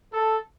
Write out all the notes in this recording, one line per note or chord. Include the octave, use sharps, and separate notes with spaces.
A4